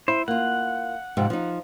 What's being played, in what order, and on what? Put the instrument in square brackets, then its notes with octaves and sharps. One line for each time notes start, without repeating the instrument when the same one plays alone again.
[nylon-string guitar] E4 [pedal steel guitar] C5
[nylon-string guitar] A#3 F4 [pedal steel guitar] F#5
[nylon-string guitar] F2 G#2 C3
F3 D#4